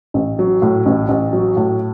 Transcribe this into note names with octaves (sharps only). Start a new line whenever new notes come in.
A1
F#3
A2
A1
A1
F#3
A2